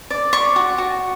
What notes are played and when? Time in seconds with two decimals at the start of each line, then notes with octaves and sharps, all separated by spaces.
0.10 D5
0.33 D5 C#6
0.56 F#4
0.78 F#4